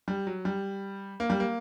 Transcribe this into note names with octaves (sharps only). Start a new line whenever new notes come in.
G3
F#3
G3
A#3
G3
A#3